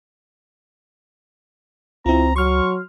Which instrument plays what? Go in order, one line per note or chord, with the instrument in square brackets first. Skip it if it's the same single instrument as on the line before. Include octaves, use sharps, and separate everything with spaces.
[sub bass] C#2 [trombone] C4 [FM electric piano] E4 F4 [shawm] A#5
[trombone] F#3 [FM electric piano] C6 F6 [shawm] C#6